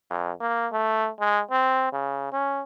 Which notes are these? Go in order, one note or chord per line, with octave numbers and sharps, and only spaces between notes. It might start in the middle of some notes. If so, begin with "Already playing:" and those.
F2
A#3
A3
G#3
C4
C#3
C#4